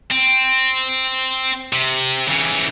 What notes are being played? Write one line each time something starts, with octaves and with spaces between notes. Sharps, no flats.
C4
C3
C#3 E3